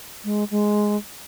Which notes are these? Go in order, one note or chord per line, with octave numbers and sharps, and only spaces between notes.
G#3
G#3